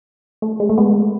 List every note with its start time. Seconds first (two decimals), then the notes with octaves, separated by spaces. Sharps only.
0.42 A3
0.60 G#3
0.69 A3
0.78 G#3 B3